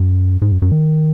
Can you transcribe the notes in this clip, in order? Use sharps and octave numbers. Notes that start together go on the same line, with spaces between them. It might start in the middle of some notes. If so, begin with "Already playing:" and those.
Already playing: F#2
G#2
F#2
F#2
D#3